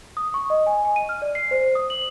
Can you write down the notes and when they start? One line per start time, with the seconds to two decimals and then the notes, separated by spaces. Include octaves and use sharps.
0.17 D#6
0.34 C#6
0.50 D#5
0.66 G#5
0.85 G#5
0.96 D#7
1.09 F6
1.22 D5
1.35 C7
1.51 C5
1.75 D#6
1.90 F#7